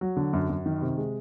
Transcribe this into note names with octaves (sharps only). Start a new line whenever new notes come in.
F#3
D3
F#2
F#2
D#3
C3
G#3